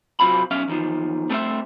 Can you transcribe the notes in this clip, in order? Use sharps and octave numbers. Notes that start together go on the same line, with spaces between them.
C3 F#3 C4 F4 B5
B1 C#4 E5 F5
E2 D#3 F3
G3 A3 C4 A#4 C5 E5